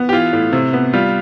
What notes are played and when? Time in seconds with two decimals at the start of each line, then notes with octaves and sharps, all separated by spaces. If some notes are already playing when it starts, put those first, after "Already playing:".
Already playing: B3
0.09 G4
0.13 E3 F4
0.33 A2
0.52 C3
0.73 B3
0.93 G3 F4